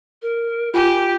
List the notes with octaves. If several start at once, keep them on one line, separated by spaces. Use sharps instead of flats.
A#4
F4 G4 G#5